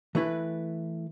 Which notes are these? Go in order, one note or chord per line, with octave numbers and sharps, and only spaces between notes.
E3 A3 E4 B4